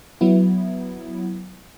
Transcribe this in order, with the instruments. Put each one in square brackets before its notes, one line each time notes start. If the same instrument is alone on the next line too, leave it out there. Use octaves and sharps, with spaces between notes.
[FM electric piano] F#3 B3 E4